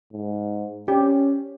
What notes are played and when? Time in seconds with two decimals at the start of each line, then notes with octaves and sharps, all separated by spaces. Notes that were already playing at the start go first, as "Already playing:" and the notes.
0.12 G#2
0.88 C#4 G4